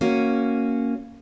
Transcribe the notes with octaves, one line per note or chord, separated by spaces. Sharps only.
A#3 C#4 F#4